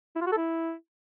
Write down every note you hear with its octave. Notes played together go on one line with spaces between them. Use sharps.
E4
F4
F#4
A4
E4